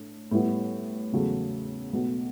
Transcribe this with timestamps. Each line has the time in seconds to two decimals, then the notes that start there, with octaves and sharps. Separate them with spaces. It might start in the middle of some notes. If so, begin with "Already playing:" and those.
Already playing: A2 A3 D4
0.31 A2 G3 B3 E4
1.12 E2 C#3 F#3 A3
1.93 B1 B2 A3